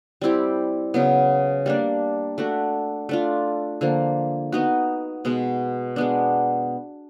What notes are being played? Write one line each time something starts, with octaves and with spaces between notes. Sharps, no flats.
G3 C4 E4 G4
C#3 F#3 B3
G3 A#3 D4
A3 D4 F#4
A3 D4 F4
D3 F3 A#3
B3 D#4 F#4
B2 G#3 B3
G#3 B3 D4